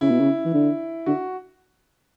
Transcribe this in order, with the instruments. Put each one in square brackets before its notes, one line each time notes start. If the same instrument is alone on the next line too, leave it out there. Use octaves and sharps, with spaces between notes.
[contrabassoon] C#3 [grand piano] E4
[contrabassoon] B2
C#3
E3
D3
[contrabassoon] D3 [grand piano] F#4